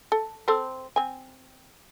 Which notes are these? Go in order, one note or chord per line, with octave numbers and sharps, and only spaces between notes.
A4
C4 A4 C5
C4 G#5